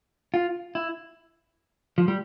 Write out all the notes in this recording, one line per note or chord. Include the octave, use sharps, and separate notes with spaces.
F4
E4
F3
G3